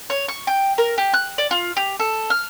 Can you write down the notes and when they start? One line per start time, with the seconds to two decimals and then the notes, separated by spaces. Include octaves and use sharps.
0.10 C#5
0.28 C#6
0.47 G5
0.78 A#4
0.98 G4
1.14 F#6
1.38 D5
1.51 F4
1.77 G4
2.00 A4
2.30 F6